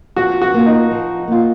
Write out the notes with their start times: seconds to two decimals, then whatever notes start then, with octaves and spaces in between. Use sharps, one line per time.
0.16 F3 F#4
0.42 F#4
0.54 A#3 F4
0.66 D#4
0.91 F3
1.28 A#3 F4